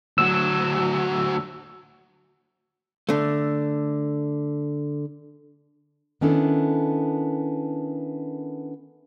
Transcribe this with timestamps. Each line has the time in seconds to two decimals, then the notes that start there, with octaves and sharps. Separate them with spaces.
0.18 D2 F#3 E6
3.09 D3 A3
6.21 D#3 B3 C#4 D4 E4 A4